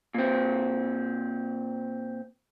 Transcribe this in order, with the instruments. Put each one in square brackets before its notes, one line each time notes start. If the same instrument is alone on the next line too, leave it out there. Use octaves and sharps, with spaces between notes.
[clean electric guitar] A#2 C4